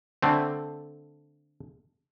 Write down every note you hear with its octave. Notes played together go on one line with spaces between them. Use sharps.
D3 A3 C4